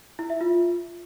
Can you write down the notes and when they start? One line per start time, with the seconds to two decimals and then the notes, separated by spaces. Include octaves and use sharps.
0.19 E4
0.30 E5
0.41 F4